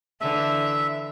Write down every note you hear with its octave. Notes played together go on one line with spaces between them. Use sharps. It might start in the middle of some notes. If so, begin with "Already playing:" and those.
D3 E3 E5